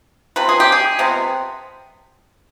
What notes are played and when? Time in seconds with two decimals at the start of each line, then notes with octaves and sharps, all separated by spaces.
0.36 C3 F3 B4
0.49 G#4
0.60 G4
0.72 G#4
0.99 C3 F3 G#3 B3